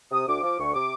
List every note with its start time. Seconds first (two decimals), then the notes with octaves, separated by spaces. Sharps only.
0.12 C3 D#6
0.28 D2 D6
0.43 F3 D6
0.59 D2 C#6
0.74 C3 D6